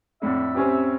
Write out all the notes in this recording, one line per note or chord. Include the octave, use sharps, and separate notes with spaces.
F2 A2 D3 E5
C4 C#4 G4